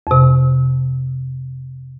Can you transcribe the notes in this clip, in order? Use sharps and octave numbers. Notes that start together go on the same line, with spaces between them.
F2 C3